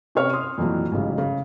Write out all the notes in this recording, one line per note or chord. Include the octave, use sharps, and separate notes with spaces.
C3 C#4 B4 C#5 F6
C6 D#6
F2 A#2 E3 F#3
A1 G#2 C#3 F#3
C#3